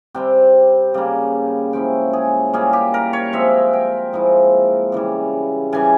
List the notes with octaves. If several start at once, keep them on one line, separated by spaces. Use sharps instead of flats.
C3 G3 C4 G5
C#3 G3 A#3
F3 G#3 C#4 E4 G5
G#4
A#2 G3 C#4 G#4
G4
A#4
C#5
F3 G#3 C4 E5
G5
A#2 F3 G#3 E4
C#3 E3 G3
C#3 E3 G3 G#5